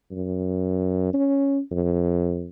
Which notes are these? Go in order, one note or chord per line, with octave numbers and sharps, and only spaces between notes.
F#2
C#4
F2